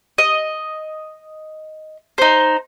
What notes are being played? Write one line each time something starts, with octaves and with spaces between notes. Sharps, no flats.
D#5
D#4 C5